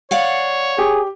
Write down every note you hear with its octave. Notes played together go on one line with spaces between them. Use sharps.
C#5 D5 F5 F#5
G4 G#4